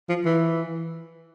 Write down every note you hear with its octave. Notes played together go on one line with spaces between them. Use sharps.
F3
E3